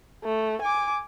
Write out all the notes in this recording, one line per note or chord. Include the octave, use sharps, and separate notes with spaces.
A3
G#5 D6